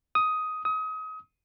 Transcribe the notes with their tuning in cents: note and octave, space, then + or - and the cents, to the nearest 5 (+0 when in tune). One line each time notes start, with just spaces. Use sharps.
D#6 +10
D#6 +30